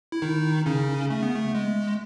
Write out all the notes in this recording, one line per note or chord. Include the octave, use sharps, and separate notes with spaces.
E4
D#3 D#4
C#3 C#4
A3
B3
A3
G#3